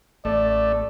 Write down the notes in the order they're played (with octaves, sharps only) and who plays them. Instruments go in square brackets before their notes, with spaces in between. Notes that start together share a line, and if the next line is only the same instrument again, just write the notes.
[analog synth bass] A1 [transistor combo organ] A3 [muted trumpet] D5